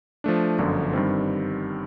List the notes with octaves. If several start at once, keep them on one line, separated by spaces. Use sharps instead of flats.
F3 A3 D4
G1 F#2 D3 F3
G2 D#3 G3 C4